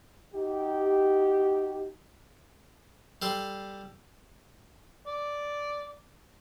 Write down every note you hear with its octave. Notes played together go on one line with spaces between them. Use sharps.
D#4 F#4 G4
G3 A4 C6
D5